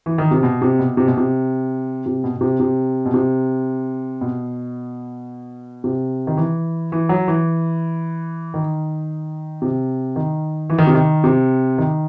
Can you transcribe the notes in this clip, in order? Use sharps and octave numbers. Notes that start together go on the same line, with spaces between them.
E3
D#3
C3
B2
C3
B2
C3
B2
C3
C3
B2
B2
C3
C3
B2
C3
B2
C3
D#3
E3
E3
F#3
E3
D#3
C3
D#3
E3
D#3
C3
D#3
C3
D#3